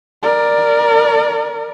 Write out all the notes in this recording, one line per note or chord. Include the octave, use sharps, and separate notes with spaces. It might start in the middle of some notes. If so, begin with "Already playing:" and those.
A#4 D5